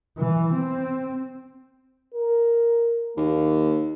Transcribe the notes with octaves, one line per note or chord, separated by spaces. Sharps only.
E3
C4
A#4
D#2 A#3